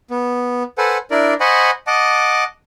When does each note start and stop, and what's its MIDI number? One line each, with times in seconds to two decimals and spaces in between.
0.10 0.63 59
0.78 0.98 69
0.78 0.98 71
0.78 0.98 72
0.78 0.98 78
0.78 0.98 80
1.11 1.34 62
1.11 1.34 64
1.11 1.34 70
1.11 1.34 74
1.40 1.71 72
1.40 1.71 75
1.40 1.71 78
1.40 1.71 80
1.40 1.71 83
1.40 1.71 85
1.87 2.44 75
1.87 2.44 78
1.87 2.44 81
1.87 2.44 86